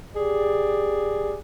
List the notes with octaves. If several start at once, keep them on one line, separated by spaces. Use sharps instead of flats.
G4 G#4 D5